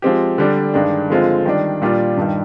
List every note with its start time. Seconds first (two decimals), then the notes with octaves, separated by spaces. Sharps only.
0.02 F3 G#3 C4 G4
0.38 D3 G3 D4
0.74 G2 D#3 G#3 D4
1.10 D3 F3 G#3 C4 F4
1.45 D#3 G3 D4
1.82 A#2 G3 D4 F4
2.17 G2 D#3 G3